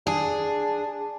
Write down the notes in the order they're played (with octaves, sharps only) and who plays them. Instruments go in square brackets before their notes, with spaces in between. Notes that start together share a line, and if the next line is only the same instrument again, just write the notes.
[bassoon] D4 [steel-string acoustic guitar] G#4